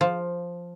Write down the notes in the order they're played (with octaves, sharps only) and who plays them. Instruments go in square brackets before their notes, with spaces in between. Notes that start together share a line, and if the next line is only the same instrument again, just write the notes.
[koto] F3